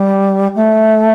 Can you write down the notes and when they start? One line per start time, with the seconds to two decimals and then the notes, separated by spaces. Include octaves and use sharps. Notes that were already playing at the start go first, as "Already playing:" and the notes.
Already playing: G3
0.55 A3